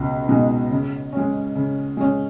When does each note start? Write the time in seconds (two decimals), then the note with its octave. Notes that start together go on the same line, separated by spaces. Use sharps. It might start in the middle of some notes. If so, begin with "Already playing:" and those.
Already playing: C#2 B2
0.29 B2 G#3 D#4
0.71 C#3
1.13 G#3 C#4
1.55 C#3
1.97 G#3 C#4